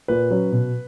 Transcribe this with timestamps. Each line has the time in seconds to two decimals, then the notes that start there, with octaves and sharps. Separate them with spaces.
0.08 A#2 B4
0.30 F#3 C#4
0.52 B2